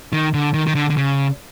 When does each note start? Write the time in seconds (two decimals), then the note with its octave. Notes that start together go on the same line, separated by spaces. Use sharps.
0.13 D#3
0.34 D3
0.54 D#3
0.67 D#3
0.75 D3
0.90 D3
0.97 C#3